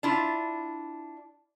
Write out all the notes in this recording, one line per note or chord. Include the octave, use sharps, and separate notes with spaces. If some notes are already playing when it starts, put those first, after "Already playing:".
D4 E4 F4